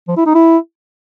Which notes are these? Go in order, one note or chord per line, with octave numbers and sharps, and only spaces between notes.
F3
E4
D#4
E4